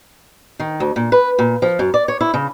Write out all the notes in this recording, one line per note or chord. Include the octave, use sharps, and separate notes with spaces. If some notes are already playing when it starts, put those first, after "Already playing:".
D#3
D2
A#2
B4
A#2
F3
F#2
D5
C#5
E4
C#3